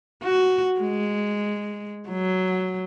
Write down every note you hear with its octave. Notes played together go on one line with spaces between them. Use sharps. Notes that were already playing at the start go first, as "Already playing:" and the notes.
F#4
G#3
F#3